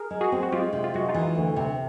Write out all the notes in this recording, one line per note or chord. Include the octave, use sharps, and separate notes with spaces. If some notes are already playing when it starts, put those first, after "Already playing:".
Already playing: G#4 A#4
G#3
F#4 G#4
C4
F#4
G#3 F4 G4
C3
F4
G#3 F#4
D#4 F4
E3
D2
C3